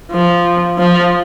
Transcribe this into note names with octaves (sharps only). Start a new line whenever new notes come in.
F3
F3